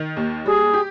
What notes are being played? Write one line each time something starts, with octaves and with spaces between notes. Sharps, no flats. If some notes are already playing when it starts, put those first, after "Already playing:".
Already playing: D#3
D#2
G3 G#4
G4